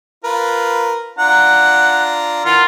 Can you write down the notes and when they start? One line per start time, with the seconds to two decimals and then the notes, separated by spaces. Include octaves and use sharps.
0.24 F4 A#4 B4
1.19 D4 F4 F#5 A#5
2.45 E3 F4 A#4 F#5